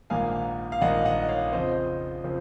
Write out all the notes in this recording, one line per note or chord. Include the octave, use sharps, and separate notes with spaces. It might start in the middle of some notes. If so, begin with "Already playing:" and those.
A#1 G#2 D#3 A#3 F5 G#5
F5
A#1 G#2 D#3 A#3 D#5 F#5
D#5 F#5
C#5 F5
F2 C#3 F3 C4 C5 D#5
C#3 F3 C4